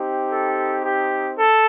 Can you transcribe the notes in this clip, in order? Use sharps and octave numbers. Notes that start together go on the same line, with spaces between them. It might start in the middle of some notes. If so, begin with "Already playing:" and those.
Already playing: C4 D#4 G4
A4
G4
A4